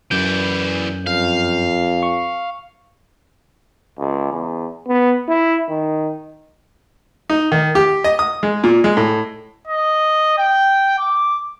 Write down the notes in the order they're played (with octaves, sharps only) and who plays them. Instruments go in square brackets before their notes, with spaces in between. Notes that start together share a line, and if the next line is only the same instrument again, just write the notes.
[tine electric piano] F#2 G6 [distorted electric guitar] E3 D5
[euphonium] F2 [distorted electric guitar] F5
[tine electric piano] C#6
[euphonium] C#2
E2
B3
E4
D#3
[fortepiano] D#4
D#3
G4
D#5
D#6
G#3
A#2
G#3
A2
[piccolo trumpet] D#5
G5
D6